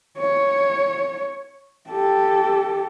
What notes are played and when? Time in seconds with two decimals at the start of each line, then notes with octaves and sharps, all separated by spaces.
0.19 C#5
1.90 G4 A4